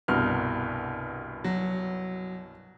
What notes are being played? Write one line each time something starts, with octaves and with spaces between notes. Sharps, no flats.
C2 G2 B2 F6
F#3